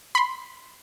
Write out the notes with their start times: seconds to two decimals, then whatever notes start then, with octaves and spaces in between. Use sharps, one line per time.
0.15 B5 C6